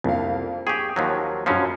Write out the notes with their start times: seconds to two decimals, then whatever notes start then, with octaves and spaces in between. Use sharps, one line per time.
0.04 C2 F2 A#3 F5
0.67 G4 G#4 G5 C#6 D#6
0.96 D#2 F3 F#3
1.46 F#2 F3 F#3 C#4 B5 C7